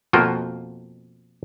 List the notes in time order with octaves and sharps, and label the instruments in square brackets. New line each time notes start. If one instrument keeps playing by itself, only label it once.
[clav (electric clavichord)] F2 B2 A#3 F4 F#4 G5